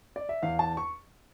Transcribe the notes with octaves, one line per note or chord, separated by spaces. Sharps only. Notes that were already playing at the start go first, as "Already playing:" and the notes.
D5
E5
E2 F5
A5
C#6